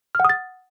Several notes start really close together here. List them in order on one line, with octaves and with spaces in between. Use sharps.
F6 F#5 D#6 A6